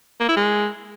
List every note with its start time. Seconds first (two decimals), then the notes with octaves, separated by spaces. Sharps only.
0.21 A#3
0.29 E4
0.37 G#3